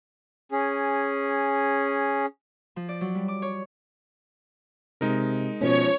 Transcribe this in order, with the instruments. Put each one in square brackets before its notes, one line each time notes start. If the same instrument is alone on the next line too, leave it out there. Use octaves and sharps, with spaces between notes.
[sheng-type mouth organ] C#4 G#4
[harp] F3
D5
F#3
G3
D6
C#5
[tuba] C3 [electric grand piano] G#3 D#4 A#4
[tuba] B2 [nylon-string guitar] F3 C#4 [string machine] C#5